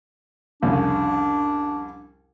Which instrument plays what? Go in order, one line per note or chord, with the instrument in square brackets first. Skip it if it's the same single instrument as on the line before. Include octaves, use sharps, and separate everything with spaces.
[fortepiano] C2 F2 C#3 [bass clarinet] D4